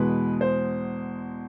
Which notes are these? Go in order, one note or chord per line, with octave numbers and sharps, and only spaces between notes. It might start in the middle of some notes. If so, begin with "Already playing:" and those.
Already playing: E2 B2 G#3 B4
C5